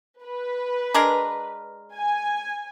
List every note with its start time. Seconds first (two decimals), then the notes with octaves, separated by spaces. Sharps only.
0.23 B4
0.94 G#3 D4 A#4
1.96 G#5